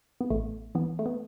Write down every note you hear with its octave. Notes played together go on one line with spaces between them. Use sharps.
B3
A1 A3
E3 B3
A3
B3